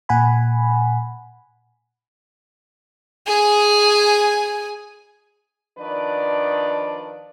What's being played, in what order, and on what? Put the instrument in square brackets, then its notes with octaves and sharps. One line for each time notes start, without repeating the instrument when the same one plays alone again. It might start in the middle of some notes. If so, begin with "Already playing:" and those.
[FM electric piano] A#2 F#5 G#5 B5
[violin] G#4 G#5
[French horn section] D#3 F3 D4 B4 D5